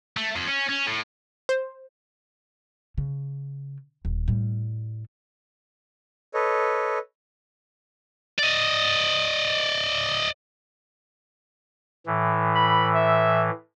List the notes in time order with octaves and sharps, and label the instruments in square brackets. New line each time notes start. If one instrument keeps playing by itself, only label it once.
[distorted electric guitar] A3
F2
C#4
C#4
A2
[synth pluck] C5
[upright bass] C#3
D#1
A2 G3
[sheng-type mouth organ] A4 B4 C#5 D#5
[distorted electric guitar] D5 D#5
[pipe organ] A2 E3
[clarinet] B5
E5